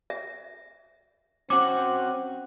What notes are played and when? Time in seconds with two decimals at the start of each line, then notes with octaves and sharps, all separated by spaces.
0.10 E5
1.50 C4 C#4 F#4 D6